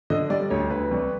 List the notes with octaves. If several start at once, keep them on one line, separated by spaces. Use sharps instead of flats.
D3 D#5
G3 D5
D2 C#5
D2 B4
C2